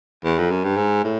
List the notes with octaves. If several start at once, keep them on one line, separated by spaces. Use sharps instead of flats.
E2
F2
F#2
G2
G#2
A2